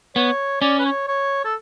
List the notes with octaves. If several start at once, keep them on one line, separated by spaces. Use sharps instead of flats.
B3 C#5
C#4 D5
B4
C#5
C#5
A4